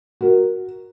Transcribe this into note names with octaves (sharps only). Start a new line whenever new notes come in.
F#4 A#4